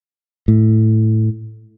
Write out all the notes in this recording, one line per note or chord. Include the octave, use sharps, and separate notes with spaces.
A2